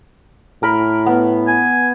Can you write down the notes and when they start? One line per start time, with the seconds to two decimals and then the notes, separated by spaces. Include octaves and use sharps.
0.63 A2 A#4 B5
1.06 B3
1.47 G#5